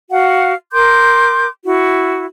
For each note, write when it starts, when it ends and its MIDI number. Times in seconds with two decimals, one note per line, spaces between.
0.10 0.53 66
0.10 0.53 77
0.10 0.53 78
0.72 1.47 70
0.72 1.47 84
0.72 1.47 86
0.72 1.47 91
1.64 2.26 64
1.64 2.26 66